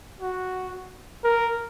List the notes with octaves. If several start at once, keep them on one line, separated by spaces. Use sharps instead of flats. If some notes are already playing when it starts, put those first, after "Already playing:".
F#4
A#4